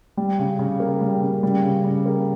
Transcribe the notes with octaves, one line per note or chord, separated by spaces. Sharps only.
G3
C#3
C#3
A#3
G3
C#3
G3
C#3
C#3
A#3